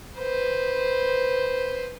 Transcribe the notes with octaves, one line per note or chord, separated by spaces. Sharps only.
B4 C5